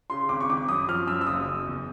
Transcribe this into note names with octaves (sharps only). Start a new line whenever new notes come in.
C#3 C6
G#1 D6
C#6
G#1 D6
F#2 D#6
F3 F6
F#2 E6
E6
F#1 D#6
F#1
E2